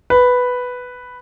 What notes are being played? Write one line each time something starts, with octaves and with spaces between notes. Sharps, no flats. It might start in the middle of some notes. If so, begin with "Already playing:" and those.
B4